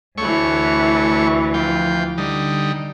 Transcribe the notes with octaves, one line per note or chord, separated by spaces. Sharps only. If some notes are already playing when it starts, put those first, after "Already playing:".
D2 E3 A3 C#5 C#6
F3 G5
D3 G3 D#4